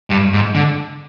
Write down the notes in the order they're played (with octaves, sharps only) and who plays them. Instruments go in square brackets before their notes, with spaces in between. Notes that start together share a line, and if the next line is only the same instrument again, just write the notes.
[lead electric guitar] G2
G#2
D3